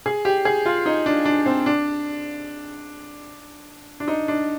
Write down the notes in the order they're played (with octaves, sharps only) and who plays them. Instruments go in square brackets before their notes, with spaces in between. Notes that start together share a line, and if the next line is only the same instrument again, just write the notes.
[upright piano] G#4
G4
G#4
F4
D#4
D4
D4
C4
D4
D4
D#4
D4